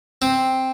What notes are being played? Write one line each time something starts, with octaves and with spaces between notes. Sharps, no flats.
C4